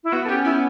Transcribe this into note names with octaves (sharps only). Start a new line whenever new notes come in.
E4
B3 F#4
A4
C#4 G4
B3 E4